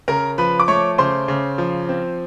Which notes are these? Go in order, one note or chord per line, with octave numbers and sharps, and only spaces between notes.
C#3 A#4 A#5
F3 B4 B5
D6
A3 C#5 C#6
C#3 C5 C6
C#3
F3
C4